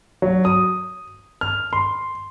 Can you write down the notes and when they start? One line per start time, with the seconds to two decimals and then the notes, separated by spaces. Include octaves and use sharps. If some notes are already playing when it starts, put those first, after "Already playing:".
0.22 F#3
0.45 D#6
1.41 F6
1.73 C6